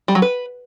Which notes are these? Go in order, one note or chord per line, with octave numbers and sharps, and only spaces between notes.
G3
F#3
B4